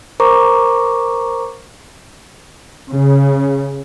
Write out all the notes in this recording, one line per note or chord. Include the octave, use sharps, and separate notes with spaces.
A#4 C5 A#5 C#6 D6
C#3